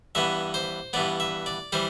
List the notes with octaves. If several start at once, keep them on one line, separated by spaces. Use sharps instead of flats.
G2 E3 B3 E5
C5
G2 E3 B3 D5
E5
D5
E3 G3 C5